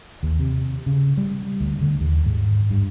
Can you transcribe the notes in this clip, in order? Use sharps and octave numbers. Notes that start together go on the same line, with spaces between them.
D#2
C3
C#3
G3
D2
D3
D#2
G#2
G2